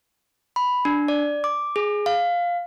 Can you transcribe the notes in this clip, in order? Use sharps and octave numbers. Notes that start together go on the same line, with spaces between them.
B5
D4
D5
D6
G#4
F5